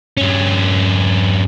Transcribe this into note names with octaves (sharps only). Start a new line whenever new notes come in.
G2 C#4